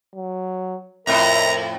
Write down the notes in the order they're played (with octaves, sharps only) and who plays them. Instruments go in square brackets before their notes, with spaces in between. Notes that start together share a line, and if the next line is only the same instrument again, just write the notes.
[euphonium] F#3
[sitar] F2 A2 [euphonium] A#4 [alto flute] E5 [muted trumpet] A#5